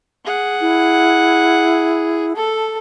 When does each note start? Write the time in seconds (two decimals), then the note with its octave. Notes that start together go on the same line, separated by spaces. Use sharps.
0.25 G#4 F#5
0.61 E4
2.36 A4 A5